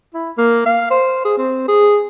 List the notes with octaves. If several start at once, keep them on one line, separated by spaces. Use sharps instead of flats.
E4
A#3
F5
C5
G#4
C4
G#4